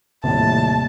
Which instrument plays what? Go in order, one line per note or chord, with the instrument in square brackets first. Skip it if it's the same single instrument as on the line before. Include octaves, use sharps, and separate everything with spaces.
[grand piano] D#1 A2 [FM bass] C3 [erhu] A5